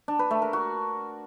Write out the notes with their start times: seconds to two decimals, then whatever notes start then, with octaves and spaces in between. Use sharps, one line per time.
0.08 D4
0.19 B4
0.31 A3
0.42 A#4
0.53 F#4